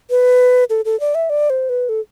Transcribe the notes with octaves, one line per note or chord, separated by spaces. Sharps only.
B4
A4
A4
D5
E5
D5
C5
B4
A4